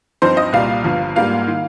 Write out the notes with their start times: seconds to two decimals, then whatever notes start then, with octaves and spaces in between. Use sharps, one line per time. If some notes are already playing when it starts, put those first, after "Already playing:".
0.22 G2 F3 C4 D#4 C5
0.37 D#5
0.53 C2 A#2 G3 F5
0.84 G1 G2 F3
1.16 G#2 G3 A#3 F4 F5
1.48 D#3